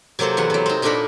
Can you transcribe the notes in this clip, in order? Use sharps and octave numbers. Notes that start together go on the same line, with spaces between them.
C3 F#3 A#3 C4 A4
E2 E3 F#5
C3 F#3
C4 D#4
A#2 D4 D#4 A4 A#4 B5